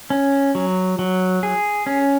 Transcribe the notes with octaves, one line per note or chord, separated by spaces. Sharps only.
C#4
F#3
F#3
G#4
C#4